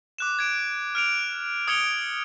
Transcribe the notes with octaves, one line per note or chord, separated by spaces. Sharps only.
D6 F#6 E7
G#6 D7 E7
F6 D7 F7
D#6 G#6 C#7 D7 F7 G7